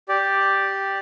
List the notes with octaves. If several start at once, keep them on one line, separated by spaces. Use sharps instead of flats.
G4 D5